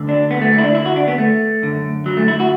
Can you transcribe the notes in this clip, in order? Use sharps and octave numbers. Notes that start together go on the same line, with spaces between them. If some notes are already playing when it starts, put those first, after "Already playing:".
Already playing: D2 D3
D4
B3
A3
A3
E4
D4
E4
F#4
D4
B3
A3
F#2 D3
F#3
A3
E4
F#4